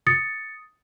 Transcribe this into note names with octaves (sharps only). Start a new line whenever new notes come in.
D#6 A6 C#7